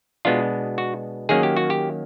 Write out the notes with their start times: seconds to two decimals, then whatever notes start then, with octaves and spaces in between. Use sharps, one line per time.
0.25 B2 G#3 B3 D4 F4
0.78 F#4
1.29 D#3 F#3 A#3 C#4 G#4
1.43 G4
1.57 F#4
1.70 G4